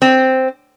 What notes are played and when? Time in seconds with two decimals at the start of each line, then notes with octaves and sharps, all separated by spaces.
0.02 C4